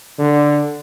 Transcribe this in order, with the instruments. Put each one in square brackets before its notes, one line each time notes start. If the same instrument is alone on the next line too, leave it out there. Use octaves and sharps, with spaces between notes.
[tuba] D3